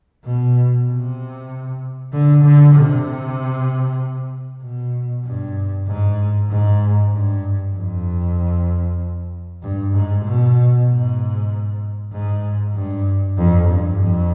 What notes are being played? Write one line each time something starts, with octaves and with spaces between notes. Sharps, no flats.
B2
C3
D3
D3
C3
B2
G2
G#2
G#2
G2
F2
G2
G#2
B2
G#2
G#2
G2
F2
G2
F2